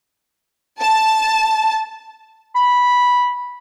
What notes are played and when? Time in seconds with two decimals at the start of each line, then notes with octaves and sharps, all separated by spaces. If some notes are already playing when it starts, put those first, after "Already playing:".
0.81 A5
2.55 B5